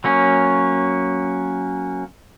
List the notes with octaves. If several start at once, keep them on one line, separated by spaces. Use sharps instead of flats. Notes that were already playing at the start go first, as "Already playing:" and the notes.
F#3 A#3 C#4